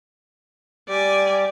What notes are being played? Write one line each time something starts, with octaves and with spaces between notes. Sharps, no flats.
G3 G4 D5 G#5